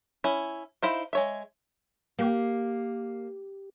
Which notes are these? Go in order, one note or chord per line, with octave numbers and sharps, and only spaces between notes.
C#4 E4
D#4 E4 C5 F5
G#3 C#5 E5
A#3 G4